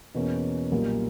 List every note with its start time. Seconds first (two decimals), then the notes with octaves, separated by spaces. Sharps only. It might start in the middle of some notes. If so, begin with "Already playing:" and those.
0.15 E2 B2 A#3 C#4
0.71 B1 A#2 G3 A#3